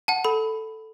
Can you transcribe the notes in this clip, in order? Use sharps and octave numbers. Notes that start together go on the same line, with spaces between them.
F#5 A5
A4 B5